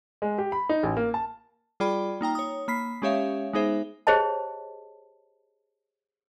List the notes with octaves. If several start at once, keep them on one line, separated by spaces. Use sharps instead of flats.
G#3
G4
B5
D#4
A1
A#3
A5
G3 F4 G#4 D5 G5 B5
A#3 D#4 G5 A#5
C#5 D#6
A#3 B5 B6 C7
G#3 C#4 G4 C#5 E5 F5
G#3 B3 D#4 G#4 C5 E5
G4 G#4 C5 C#5 D#5 A5